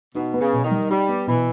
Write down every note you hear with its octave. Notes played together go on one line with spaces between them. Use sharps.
B2 D#4
B3
C#3
B2
D#3
G3
G3 D#4
B3
B2 E3